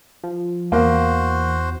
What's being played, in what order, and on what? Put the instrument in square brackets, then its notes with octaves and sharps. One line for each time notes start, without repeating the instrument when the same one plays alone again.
[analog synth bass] F3
[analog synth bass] E2 [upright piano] A#3 [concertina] F#4 C5